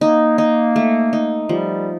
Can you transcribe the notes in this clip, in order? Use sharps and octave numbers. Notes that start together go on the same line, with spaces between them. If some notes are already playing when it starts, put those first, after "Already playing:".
A#3 D#4
D#4
A3
D#4
F3 G3